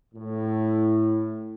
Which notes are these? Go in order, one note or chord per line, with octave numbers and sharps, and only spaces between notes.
A2